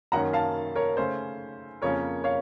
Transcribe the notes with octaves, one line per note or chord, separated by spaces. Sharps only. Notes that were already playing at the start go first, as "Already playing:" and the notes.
F#2 D#3 A#3 C#4 F#5 A#5
F5 A5
A#4 C#5
C#3 A3 C#4 C5
F2 C#3 F3 A#3 C#4 A#4 C#5
C#5 F5